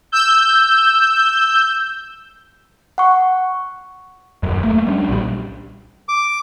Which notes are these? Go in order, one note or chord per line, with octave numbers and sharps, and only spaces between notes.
E6 G6
F#5 C#6
D#1 F#2
A3 A#3
G3 C#4 D4
B1 A#2 E3 G3
D6